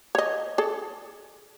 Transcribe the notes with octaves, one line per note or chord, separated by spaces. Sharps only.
C#5 D#5
G#4 A4